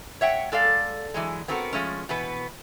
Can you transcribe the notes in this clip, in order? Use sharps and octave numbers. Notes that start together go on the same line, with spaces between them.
C#5 E5 F#5 G5
G#3 A4 D5 F5
E3 F#3 G#3
B3 C4 F#4 A4 A#4
F3 G#3 A3 C#4
B2 E3 B3 B4